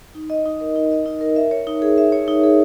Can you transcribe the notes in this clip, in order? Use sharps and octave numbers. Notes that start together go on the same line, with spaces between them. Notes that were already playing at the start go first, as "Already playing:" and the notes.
D#4
D#5
D#4
A#4
D#4
D#5
D#4
A#4
E5
C#5
D#4
G#4
E5
C#5
D#4
G#4